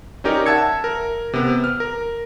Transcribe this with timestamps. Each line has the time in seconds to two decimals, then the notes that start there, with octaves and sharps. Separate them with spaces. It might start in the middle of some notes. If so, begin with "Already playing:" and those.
0.24 C#4 D#4 G4 A#4 C#5 D5
0.46 E5 F#5 A5 E6 G#6 C#7
0.84 A#4
1.33 C3 B3
1.64 F6
1.80 A#4